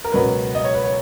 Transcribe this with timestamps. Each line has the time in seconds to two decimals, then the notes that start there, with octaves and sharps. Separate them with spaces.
0.04 A#4
0.12 C#2 B2 F#3 A#3 B4
0.55 D#5
0.64 C#5
0.75 B4
0.84 C#5